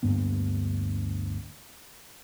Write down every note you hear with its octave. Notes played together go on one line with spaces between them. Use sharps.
D2 G2 A#3 B3